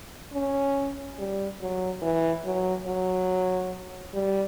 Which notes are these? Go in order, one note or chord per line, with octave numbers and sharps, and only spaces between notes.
C#4
G3
F#3
E3
F#3
F#3
G3